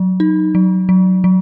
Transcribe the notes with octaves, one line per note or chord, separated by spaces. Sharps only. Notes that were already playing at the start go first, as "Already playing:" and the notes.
Already playing: F#3
D#4
F#3
F#3
F#3